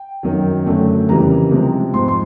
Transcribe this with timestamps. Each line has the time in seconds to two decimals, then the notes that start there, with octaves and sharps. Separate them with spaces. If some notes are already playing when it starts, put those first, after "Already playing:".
Already playing: G5
0.23 F#2 D#3 F#3
0.66 F#2 D3 F#3 A3
1.09 F2 C#3 E3 G3 A#3 A#5
1.51 C3 F3 G#3
1.94 G#2 F3 G#3 C6
2.08 C6